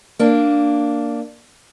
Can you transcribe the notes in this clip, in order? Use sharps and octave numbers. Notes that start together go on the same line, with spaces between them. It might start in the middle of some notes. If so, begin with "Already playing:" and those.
A#3 D4